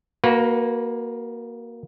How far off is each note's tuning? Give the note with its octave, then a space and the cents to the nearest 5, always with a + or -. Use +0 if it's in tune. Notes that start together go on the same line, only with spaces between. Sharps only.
A#3 +5 F#4 +0 B4 -25